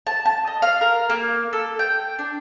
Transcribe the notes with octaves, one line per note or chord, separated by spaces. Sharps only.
A5
A5
D#5
F5
A#4
A#3
A4
G5
D4